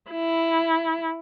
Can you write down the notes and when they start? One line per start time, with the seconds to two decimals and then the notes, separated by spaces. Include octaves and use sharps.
0.11 E4